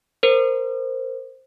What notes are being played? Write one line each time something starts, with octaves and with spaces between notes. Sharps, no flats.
A#4 C5